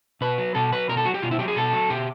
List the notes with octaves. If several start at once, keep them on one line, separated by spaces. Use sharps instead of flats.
B2 B4
F#3
B2 A4
F#3 B4
B2 A#4
A4
F#3 F#4
G4
B2 F4
E4
F#3 G4
G#4
B2 A4
F#3
B2 G4